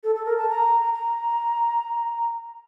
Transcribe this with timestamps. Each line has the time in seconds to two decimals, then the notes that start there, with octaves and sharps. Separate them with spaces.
0.04 A4
0.15 A4
0.25 A#4
0.38 A5
0.49 A#5
0.93 A#5